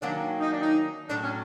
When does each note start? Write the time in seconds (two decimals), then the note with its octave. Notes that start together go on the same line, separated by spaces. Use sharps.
0.02 D#3 F#3 A#3 C#4 D4
0.40 D#4
0.51 D4
0.61 D#4
1.10 A2 F#3 A3 D4
1.23 C#4